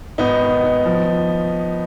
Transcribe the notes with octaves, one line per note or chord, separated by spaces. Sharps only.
G#1 B3 D#4
D#3
D#3
F3